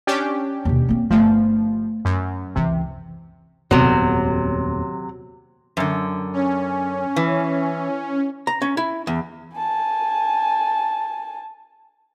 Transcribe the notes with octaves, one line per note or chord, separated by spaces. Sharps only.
C#4 D4 G4
D#2 B2
A#3 C4
G1 F3 A3
F#2
C#2 C3 E3
D#1 F2 C3 F#3 B3
F#2 D3
C#4
E3
A#5
C#4
E4
E2
G#5 A5